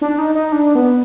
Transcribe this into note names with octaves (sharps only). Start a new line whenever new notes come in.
D4
D#4
D#4
D4
B3